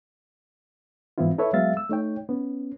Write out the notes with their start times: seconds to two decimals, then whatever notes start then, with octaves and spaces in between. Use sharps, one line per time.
1.18 G#2 E3 B3 C4 E4 F4
1.38 E4 A4 B4 C#5 E5
1.53 F#3 G#3 B3 E5 F5 A6
1.77 E6
1.89 A3 D#4 C#5 G5
2.29 B3 C#4